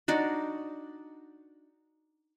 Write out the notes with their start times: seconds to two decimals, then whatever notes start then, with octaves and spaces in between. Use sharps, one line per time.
0.08 D4 D#4 F#4